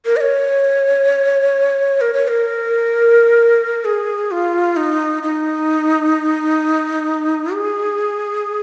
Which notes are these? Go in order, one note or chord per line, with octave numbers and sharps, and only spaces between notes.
A#4
D#5
C#5
A#4
C#5
A#4
G#4
F4
D#4
D#4
G#4